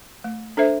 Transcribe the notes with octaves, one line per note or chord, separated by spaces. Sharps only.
A3
D4 A4 C5 E5